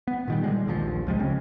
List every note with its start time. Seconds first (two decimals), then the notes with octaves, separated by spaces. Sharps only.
0.07 B3
0.28 A#2 D#3 G3
0.43 D3 G3 G#3
0.67 A#1 D#2 F3
1.07 C#2 F3 G3 G#3
1.19 C#3 G#3 C4 C#4